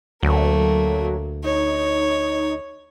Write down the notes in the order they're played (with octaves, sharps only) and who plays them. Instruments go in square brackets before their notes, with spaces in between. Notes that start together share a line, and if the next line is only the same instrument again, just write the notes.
[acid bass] D2 [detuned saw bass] F#3 [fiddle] A3 A#3
[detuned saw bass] D#4 [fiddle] C#5